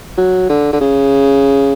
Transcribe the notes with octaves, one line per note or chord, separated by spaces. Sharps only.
F#3
D3
D3
C#3